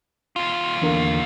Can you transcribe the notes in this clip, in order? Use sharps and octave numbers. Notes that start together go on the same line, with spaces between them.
D#2 F4
E2 D3 A#3